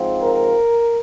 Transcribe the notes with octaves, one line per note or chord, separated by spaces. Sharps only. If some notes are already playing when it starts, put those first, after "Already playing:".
Already playing: G#2 F3 C4
A#4